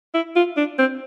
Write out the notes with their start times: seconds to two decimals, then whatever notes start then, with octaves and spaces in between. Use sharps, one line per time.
0.14 E4
0.36 F4
0.57 D4
0.79 C4